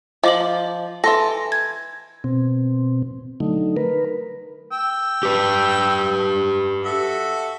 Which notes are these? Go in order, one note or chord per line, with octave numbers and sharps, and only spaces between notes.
F3 D#5 D6 F#7
E3 A4 C6 A#6
G#6
B2 C4
D3 F#3 A3 D#4
A#4 B4
G5 E6
G4 B4
F#4 A4 E5